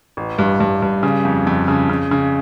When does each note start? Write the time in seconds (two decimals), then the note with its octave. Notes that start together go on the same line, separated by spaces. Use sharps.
0.17 A1
0.38 G2
0.60 G2
0.82 G2
1.03 C#3
1.25 F2
1.47 F2
1.68 C#3
1.89 C#3
2.11 C#3